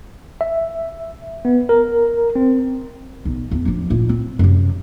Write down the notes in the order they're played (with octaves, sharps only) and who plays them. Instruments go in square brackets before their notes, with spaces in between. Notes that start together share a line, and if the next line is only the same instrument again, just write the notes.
[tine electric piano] E5
B3
A#4
C4
[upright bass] B1
E2
F3 D4
A#2 E4
C4
F#2 C3